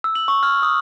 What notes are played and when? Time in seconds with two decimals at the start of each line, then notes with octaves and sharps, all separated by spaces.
0.04 E6
0.15 F#7
0.28 C#6
0.43 F6
0.63 D#6